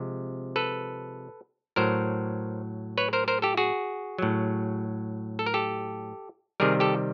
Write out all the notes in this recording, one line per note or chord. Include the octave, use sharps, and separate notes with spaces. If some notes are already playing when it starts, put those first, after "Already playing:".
Already playing: C3 F3 G#3
A4 B4
A2 F#3 A#4 C5
B4 C#5
A#4 C5
A#4 C5
G4 A4
F#4 G#4
A2 F#3
A4
A#4
G4 A4
C3 D#3 G3 G#4 A#4
G4 A4